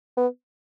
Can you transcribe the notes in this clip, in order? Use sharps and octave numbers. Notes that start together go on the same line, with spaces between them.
B3